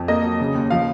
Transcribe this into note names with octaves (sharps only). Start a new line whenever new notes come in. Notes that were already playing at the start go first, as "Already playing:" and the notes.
Already playing: F2
A#3 D#5
F#3
C#3
D#2
F3 F5